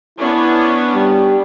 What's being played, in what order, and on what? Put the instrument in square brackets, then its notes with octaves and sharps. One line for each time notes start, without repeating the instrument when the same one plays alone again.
[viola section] B3 C#4 D4 [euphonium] E4
[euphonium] G3